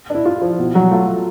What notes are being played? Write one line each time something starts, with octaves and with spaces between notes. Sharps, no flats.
D4 E4
F4
F3
B2
F#3
A3 F4